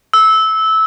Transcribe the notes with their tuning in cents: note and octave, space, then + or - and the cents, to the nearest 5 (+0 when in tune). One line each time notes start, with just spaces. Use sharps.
E6 -15